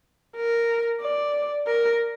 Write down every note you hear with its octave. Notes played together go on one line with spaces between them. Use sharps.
A#4
D5
A#4